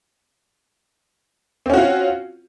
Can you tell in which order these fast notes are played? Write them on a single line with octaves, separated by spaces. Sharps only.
C4 C#4 F#4 F4